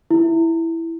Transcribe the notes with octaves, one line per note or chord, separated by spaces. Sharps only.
E4